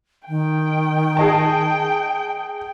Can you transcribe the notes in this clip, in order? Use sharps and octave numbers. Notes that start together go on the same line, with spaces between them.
D#3 G5
G#4 D#5 A5